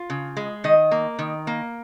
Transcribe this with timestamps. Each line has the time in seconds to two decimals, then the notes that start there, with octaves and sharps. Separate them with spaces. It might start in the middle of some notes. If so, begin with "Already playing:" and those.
Already playing: F4
0.10 C#3
0.37 G#3
0.64 D#3 D#5
0.91 A#3
1.19 D#3
1.47 A#3